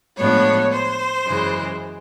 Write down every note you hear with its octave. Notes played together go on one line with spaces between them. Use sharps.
A2 F3 G#3 B3 D4 C#5
C5
F#2 C#3 E3 G#3